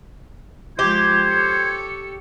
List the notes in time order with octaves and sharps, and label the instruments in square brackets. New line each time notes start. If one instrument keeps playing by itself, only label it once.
[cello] F3 G#3 [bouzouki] G4 [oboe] C5 [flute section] G#6
[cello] A4 C#5